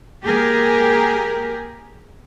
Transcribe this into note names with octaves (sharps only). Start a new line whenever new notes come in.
A#3 G4 G#4 A#4